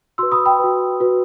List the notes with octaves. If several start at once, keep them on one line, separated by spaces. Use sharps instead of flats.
F#4 B4 C6 E6
B5 D#6
G5 B5
F#4 B4
F#4 B4